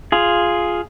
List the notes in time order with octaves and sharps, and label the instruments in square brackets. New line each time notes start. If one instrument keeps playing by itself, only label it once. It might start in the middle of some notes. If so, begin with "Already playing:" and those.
[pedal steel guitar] F4 G#4